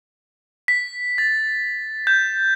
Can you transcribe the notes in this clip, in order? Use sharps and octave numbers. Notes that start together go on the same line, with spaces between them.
B6
A6
G6